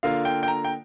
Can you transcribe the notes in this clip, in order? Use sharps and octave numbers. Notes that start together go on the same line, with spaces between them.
D3 A#3 F4 F5
G5
G5
A#5
G5